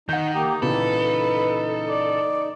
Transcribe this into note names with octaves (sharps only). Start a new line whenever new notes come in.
D#3 D#4 F#5 G6
A#3 D#4 G4
A#2 C#3 E3 D#4 A4 B4
D5